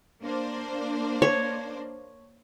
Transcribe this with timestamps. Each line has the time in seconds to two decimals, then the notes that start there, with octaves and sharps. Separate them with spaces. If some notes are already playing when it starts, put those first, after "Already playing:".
0.22 A#3 D4 C5
1.22 C#5